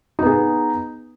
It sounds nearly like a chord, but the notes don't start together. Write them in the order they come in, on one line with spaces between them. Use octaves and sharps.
D#4 B3 G#4